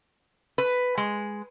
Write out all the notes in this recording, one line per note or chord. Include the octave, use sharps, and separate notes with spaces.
B4
G#3